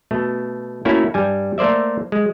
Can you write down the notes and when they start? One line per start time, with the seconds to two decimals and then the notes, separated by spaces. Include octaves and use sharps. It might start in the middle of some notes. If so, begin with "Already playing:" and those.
0.11 B2 A3
0.85 A3 A#3 C#4 E4 F#4
1.14 G2 G3 G#5
1.58 A3 A#3 C5 D5 E5
2.12 G#3